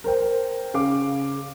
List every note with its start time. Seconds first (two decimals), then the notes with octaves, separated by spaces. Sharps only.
0.04 A#4 C5 G5
0.74 C#3 F5 D6